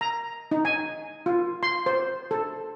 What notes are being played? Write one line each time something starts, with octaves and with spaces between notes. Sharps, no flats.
A#5
D#4
G#5
F4
C6
C5
A4